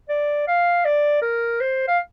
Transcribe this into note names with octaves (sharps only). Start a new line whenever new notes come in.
D5
F5
D5
A#4
C5
F5